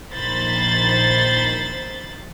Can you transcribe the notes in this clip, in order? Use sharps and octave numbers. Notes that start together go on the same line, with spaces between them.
A#1 D#3 C5 B5 A6